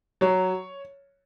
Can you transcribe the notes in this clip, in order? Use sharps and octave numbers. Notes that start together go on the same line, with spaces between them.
F#3 C#5